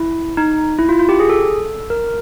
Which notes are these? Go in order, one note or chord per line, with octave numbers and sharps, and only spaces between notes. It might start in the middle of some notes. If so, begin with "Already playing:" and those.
Already playing: E4
D#4
E4
F4
F4
G4
G#4
A4
A#4